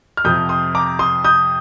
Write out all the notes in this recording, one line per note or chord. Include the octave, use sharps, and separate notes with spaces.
F6
F2 C3 F3 D#6 G6
C6 D#6
A#5 D6
C6 D#6
D#6 G6